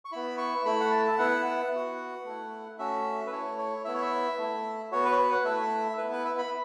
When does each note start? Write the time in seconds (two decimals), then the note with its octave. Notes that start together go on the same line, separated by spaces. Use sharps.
0.05 C#6
0.12 B3 E4 B5
0.38 C#6
0.65 A3 E4 B5
0.80 F#5
0.91 A5
1.08 E5
1.18 B3 E4 F#5
1.45 F#5
1.72 B3 F#4
2.25 A3 E4
2.78 A3 C#4 F#4 E5
3.26 B4
3.32 A3 E4 C#5
3.58 C#5
3.85 B3 E4 E5
3.94 C#5
4.02 E5
4.38 A3 E4
4.92 B3 F#4 C#5
5.05 B4
5.12 C#5
5.18 B4
5.32 F#5
5.45 A3 E4 E5
5.98 B3 E4 B4
6.12 B4
6.25 E5
6.38 B5